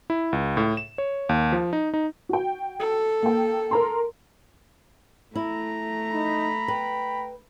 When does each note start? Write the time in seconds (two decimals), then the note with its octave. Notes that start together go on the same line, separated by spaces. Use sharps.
0.10 E4
0.33 C#2
0.57 A2
0.77 E7
0.98 C#5
1.29 D#2
1.52 F3
1.73 D#4
1.94 D#4
2.29 F#4 G5
2.80 A4
3.23 A#3 G5
3.71 A#4 A#5 C6
5.35 A3 E4 A#5
6.12 D#4 B5
6.68 B4 G5